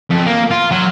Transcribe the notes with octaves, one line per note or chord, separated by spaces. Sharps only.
F2
A#3
F4
F#3